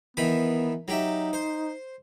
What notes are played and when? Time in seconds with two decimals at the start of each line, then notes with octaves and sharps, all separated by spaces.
0.17 D#3 E3 B3 B5
0.88 F#3 D#4 G4 E5
1.33 C5